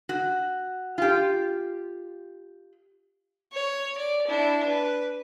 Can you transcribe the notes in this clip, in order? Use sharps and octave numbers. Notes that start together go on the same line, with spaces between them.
F#4
F4 G4
C#5
D5
D4 E4
B4